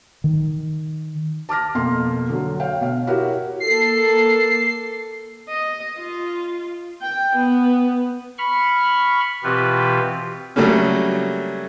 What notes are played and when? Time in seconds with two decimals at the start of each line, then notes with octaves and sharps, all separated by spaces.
0.24 D#3
1.49 A5 D6 F6 A#6
1.75 F2 B2 A#3 C6
2.29 D3 F#3
2.60 C#5 F5 G5
2.81 B2 F5
3.07 E4 F#4 G4 A#4 C#5 F#5
3.60 A#3 A4 C7
5.49 D#5
5.99 F4
7.02 G5
7.36 B3
8.38 B5 C#6 F6
9.44 B2 E3 C4 F4 G4 B4
10.56 C#3 F#3 G3 A3 A#3 C#4